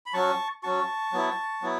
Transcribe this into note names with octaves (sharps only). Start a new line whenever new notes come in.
B5
F#3 C#4 F#4 A5 C#6
F#3 C#4 F#4 A5 C#6
F#3 B3 E4
F#3 B3 E4